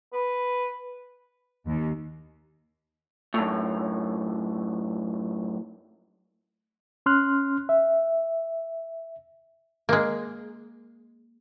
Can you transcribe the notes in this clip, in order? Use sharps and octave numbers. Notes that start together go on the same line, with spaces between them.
B4
D#2
F#2 A2
C#4 C6 F6 F#6
E5
G#3 A#3